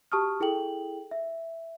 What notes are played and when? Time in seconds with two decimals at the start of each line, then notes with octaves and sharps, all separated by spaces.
0.12 F#4 G4 A5 C#6 D#6 F6
0.40 E4 G#4 A4 G5 F#7
1.11 E5